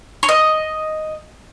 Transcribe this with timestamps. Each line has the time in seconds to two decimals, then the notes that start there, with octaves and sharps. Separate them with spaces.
0.23 C#5
0.29 D#5